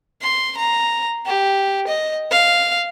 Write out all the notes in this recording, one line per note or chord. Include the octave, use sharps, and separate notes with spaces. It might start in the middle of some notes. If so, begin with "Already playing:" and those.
C6
A#5
G4
D#5
F5